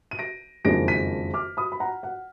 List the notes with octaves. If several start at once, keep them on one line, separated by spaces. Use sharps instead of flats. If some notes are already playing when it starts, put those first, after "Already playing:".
D#7
A#6 D7
F#1 F2 D#3 G#3 D4 A#6 D7
B6 D#7
D6 F6
B5 D#6
B5
F#5 A#5
F#5